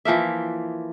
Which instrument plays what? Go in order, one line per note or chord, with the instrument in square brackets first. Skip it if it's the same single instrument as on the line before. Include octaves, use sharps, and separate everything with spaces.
[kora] E3 F3 A#3 E5